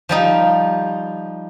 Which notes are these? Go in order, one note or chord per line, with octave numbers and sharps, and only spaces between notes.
F3 G3 D#4